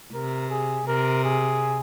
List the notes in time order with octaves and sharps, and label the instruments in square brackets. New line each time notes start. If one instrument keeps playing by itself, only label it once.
[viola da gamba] C3 [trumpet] A#4
[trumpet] G#4
[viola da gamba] C3 [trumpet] A#4
[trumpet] G#4